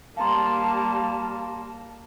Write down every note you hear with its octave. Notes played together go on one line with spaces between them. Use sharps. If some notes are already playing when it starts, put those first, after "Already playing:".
G3 A#3 F5 A5 A#5 C6